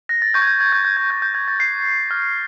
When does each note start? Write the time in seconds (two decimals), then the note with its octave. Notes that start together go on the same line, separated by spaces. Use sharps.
0.09 F#6 A#6
0.22 A6
0.34 C#6 G6
0.42 G#6
0.47 G6
0.60 F#6 G#6
0.72 G6
0.84 F#6 G6
0.97 G#6
1.10 D6 G6
1.22 G6
1.34 G6 G#6
1.48 A6
1.59 F#6 C7
1.84 F#6
2.11 F6